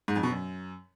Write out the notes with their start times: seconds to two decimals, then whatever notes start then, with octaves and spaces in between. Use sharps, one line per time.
0.08 G#2
0.16 F2
0.23 B2
0.31 F#2